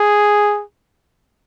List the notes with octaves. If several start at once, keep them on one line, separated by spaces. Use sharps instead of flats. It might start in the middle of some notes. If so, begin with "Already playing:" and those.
Already playing: G#4